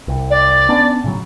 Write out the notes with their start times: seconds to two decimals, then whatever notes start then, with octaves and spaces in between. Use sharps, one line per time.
0.08 C2
0.30 D5
0.69 B3 C#4 D4
1.04 A2 C#3 F#3